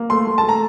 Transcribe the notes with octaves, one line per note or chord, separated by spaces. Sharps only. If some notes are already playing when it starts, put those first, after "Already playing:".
Already playing: A#3
A3 C6
A3
A5
A3
A#5